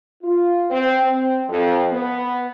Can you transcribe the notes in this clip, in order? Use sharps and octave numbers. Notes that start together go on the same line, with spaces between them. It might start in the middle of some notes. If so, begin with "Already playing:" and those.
F4
C4
C4
F2
B3